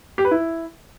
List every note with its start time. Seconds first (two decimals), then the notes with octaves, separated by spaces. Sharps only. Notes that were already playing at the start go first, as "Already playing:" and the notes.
0.18 G4
0.25 B4
0.31 E4